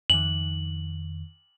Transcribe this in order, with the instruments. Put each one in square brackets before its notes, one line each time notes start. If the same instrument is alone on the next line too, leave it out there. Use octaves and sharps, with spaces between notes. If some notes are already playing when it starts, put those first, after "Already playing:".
[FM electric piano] F2 D#3 [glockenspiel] F#7